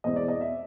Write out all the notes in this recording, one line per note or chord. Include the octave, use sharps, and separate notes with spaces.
E2 B2 G#3 C4 E4 D#5
D5
D#5
E5